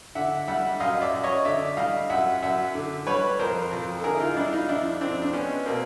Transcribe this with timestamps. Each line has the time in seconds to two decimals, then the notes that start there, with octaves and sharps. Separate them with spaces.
0.15 D3 E5 F#5
0.48 G3 E5 F#5
0.80 F#2 D#5 F5
1.01 D5 E5
1.12 F#2
1.24 C#5 D#5
1.45 D3 D5 E5
1.77 G3 D#5 F5
2.10 F#2 E5 F#5
2.42 F#2 E5 F#5
2.74 D3
3.07 G3 B4 C#5
3.39 F2 A#4 C5
3.72 F2
3.97 A4
4.04 D3 G#4 A#4
4.14 E4
4.20 D#4 F4
4.36 G3 D4 E4
4.52 D#4 F4
4.69 F2 D4 E4
5.01 F2 C4 D4
5.22 D4
5.33 G#3 B3 C#4
5.66 B2 A#3 C4